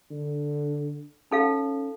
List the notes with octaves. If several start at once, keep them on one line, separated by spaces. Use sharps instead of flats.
D3
C#4 D#4 A4 F5